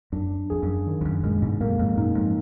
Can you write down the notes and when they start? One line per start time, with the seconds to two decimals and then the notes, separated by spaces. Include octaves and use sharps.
0.12 F#2 D4
0.50 F2 G#4
0.63 F#2
0.87 D#3
1.01 F2
1.05 F#2
1.24 F#2 A#2 G#3
1.42 G#2 B2
1.61 F#2 A#2 A#3
1.79 F2 G#2
1.97 F#2 A#2 D#4
2.15 F2 G#2